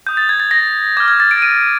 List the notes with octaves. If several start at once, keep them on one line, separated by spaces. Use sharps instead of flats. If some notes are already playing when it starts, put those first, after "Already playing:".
D#6 G6
A6
G#6
A6
A#6
D6 F6 G#6
G#6
A6
D7
D#7